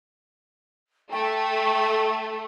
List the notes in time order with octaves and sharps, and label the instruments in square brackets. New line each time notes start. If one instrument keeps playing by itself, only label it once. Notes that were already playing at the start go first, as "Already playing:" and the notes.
[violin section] A3 [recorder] G5